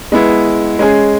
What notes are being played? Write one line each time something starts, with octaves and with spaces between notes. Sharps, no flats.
G#3 B3 E4
G#3 C#4 G#4